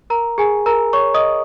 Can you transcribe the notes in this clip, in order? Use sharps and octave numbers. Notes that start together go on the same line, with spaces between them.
A#4 A#5
G#4 G#5
A#4 A#5
C#5 C#6
D#5 D#6